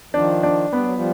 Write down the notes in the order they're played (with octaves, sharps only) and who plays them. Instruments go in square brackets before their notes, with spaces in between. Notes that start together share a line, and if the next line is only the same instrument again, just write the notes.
[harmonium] D#3 F3 [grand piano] D4
[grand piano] D4
[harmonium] G3 [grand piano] B3
[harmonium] F#3
F3 G3